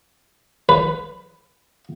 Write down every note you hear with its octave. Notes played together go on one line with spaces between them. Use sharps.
B4